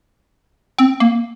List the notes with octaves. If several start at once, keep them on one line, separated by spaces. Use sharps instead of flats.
C4
A#3